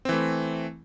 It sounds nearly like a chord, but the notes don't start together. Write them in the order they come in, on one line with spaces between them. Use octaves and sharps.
C4 E3 A3